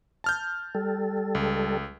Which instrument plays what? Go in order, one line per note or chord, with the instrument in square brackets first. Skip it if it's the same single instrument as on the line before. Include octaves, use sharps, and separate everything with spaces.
[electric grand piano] A5 F6 G6
[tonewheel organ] G3 A4
[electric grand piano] C#2